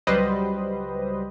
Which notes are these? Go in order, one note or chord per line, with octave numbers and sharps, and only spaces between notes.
C#2 F#3 G3 B4 C5 D#5